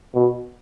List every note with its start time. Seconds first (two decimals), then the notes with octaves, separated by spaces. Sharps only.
0.15 B2